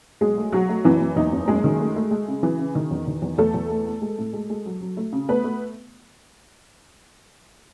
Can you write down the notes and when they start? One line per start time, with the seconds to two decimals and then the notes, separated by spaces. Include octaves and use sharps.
0.21 B1 G#3 G#4
0.38 A3
0.53 B1 F#3 F#4
0.69 A3
0.85 F#1 E3 E4
1.01 F#1
1.16 E2 D#4
1.32 F#1
1.48 F#2 G#3 G#4
1.64 D#3
1.80 A3
1.96 A3
2.11 G#3
2.28 C#3
2.43 E3
2.59 C#3
2.75 D#3
2.91 E2
3.07 D#3
3.22 E2
3.38 E2 A3 A4
3.54 E2
3.70 A3
3.86 A3
4.02 G#3
4.18 A2
4.33 G#3
4.50 G#3
4.65 F#3
4.81 F#3
4.97 A3
5.13 C#3
5.29 A3 B3 B4
5.44 A3